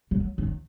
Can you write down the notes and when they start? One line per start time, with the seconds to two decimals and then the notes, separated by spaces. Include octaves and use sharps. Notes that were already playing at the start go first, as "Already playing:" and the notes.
0.11 F#3
0.38 D#3